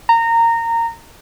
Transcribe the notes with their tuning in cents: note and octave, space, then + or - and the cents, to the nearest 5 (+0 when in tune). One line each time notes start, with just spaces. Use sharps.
A#5 -20